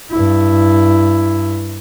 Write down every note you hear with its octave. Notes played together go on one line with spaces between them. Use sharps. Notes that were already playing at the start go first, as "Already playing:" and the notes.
G2 E4